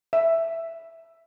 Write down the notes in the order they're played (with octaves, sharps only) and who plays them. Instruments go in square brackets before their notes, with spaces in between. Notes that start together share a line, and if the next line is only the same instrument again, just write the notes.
[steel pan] E5